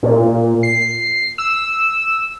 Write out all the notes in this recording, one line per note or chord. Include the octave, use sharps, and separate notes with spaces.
A#2
C7
E6